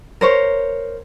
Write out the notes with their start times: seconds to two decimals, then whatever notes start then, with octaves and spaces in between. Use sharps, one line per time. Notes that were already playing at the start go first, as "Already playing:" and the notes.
0.21 A#4 C5 C#5